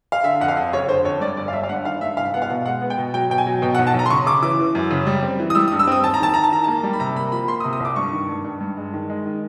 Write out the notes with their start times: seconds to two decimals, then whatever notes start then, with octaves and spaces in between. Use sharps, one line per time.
0.12 F5
0.24 D3 E5
0.40 F2 F#5
0.48 F5
0.57 F2
0.73 F#1 C#5
0.89 D3 C5
1.04 F2 C#5
1.20 G2 D5
1.37 G1 D5
1.48 F5
1.53 G1 E5
1.63 F5
1.69 G2 F#5
1.85 D#3 F5
2.01 G2 E5
2.17 C2 F5
2.34 B3 F#5
2.42 F5
2.50 B2
2.66 G#3 F#5
2.81 B3
2.90 G5
2.98 B2
3.14 F#3 G5
3.30 B2 G5
3.38 G#5
3.47 F#3
3.62 B2 G5
3.75 F#5
3.79 B1
3.87 A5
3.94 B1 A#5
4.06 C6
4.10 C#3 C#6
4.26 C#3 D6
4.42 E3 D6
4.59 E3
4.75 F#2
4.91 C#3
5.07 G3
5.23 C4
5.39 E3
5.50 D#6
5.55 G3 E6
5.68 D#6
5.72 G2
5.79 E6
5.87 C4 D#6
6.04 D#2 A5
6.14 A#5
6.20 D#3 A5
6.34 D#3 A#5
6.44 A5
6.51 D#3 A#5
6.64 A#3 A5
6.83 G3
6.93 B5
7.00 C3 A#5
7.16 A#3 B5
7.32 F3 B5
7.48 A#3 C6
7.60 D#6
7.64 C3
7.73 D#6
7.80 C2 D6
7.96 G2 C#6
8.13 D#3
8.29 G2
8.44 G2
8.61 G2
8.77 G#3
8.93 D#3
9.10 G#3
9.26 D#3